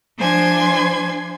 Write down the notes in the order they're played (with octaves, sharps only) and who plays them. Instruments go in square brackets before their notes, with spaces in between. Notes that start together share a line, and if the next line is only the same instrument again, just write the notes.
[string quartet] F3 D4 C5 G#5 C6 G#6